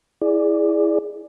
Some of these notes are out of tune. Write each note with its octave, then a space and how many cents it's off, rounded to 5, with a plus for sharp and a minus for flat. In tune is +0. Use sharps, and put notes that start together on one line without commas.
E4 +0 G#4 +0 D5 +0